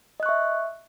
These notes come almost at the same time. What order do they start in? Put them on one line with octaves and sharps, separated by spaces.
D#5 F#6 C#6 E5